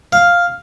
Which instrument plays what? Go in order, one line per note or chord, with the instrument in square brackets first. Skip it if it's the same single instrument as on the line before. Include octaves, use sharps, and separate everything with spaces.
[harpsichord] F5